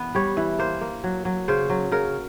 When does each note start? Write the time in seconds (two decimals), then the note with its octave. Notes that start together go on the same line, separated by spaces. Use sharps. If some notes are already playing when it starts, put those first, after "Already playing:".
Already playing: E3 B3
0.15 G3 C#5
0.37 E3
0.59 A#3 C5
0.81 A#3
1.04 F#3
1.25 F#3
1.48 C#3 C5
1.70 F#3
1.92 C#3 A#4